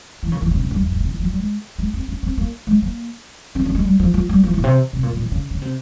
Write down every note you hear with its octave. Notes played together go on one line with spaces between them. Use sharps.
E3
C#3
E3
C3
C#3
G2
F2
G2
C3
E3
F3
G3
G#3
G#3
C4
C#4
C4
A#3
G#3
A#3
C4
C#4
G#3
G3
F3
F3
G3
F3
E3
A#2
C3
C3
A#2
A#2
E3
C#3
C#3
C3